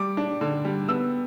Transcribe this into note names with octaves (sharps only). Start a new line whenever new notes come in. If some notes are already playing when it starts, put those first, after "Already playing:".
Already playing: G3 D6
D4
D3
G3
B3 E6